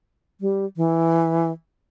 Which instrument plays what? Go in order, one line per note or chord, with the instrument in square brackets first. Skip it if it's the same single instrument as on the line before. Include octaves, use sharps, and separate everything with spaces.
[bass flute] G3
E3